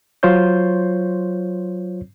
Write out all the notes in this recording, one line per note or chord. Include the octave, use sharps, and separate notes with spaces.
F#3 F4 C5 C#5 G6